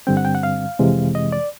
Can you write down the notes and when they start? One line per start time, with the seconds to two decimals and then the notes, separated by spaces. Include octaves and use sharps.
0.07 G2 D3 G3 C4 G5
0.17 F#5
0.25 G5
0.35 F#5
0.43 F5
0.79 F2 C3 E3 G#3
1.15 D#5
1.32 D5